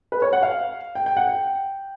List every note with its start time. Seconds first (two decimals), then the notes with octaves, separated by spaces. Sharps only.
0.12 B4
0.22 C#5
0.33 F#5
0.43 F5
0.95 G5
1.06 G5
1.17 F#5
1.28 G5